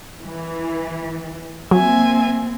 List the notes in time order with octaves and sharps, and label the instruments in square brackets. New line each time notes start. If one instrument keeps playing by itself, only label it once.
[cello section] E3
[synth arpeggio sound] F#3 [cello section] A#3 C4 [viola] E5 G#5